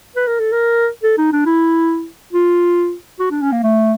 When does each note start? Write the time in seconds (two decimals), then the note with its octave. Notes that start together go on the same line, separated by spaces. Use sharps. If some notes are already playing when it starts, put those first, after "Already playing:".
0.16 B4
0.28 A#4
0.40 A4
0.52 A#4
1.03 A4
1.18 D#4
1.33 D4
1.46 E4
2.33 F4
3.20 F#4
3.31 D4
3.42 C#4
3.52 A#3
3.63 A3